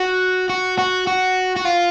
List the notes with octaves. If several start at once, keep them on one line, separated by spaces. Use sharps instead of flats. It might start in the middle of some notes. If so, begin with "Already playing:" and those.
Already playing: F#4
F#4
F#4
F#4
F#4
F4